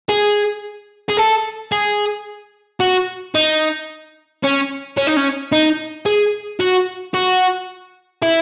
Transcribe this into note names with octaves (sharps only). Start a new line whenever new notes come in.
G#4
G#4
A4
G#4
F#4
D#4
C#4
C#4
D#4
C#4
D#4
G#4
F#4
F#4
E4